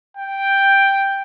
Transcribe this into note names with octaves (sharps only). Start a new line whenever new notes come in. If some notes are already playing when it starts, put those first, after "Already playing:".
G5